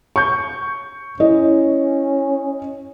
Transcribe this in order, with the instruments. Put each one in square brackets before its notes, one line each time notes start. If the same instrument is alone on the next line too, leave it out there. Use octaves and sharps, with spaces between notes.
[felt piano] C#6 G6
[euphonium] C#4 [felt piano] E4 D#5